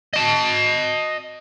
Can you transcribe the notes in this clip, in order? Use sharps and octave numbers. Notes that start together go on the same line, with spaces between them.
D#5 A5